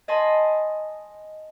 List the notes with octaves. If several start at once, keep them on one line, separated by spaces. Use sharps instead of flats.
D#5 G#5 A5 B5 C6